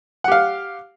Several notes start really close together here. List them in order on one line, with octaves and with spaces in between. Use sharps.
F#5 G4 F5